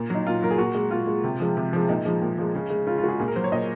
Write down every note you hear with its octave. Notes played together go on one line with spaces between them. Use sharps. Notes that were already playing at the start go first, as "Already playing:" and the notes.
Already playing: A#2
F#3 D#4
A#2 F4
F#3 A#4
G#4
A#2 F#4
G#3
A#2 F4
G#3
C3
F3 G#3
C3
F3 G#3
A#2 D#4
F3 G#3
A#2
F3 G#3
C#3
G#3
C#3 F4
F4
G#3 F#4
G#4
A#2 G#4
A#4
F#3 C5
C#5
A#2 D#5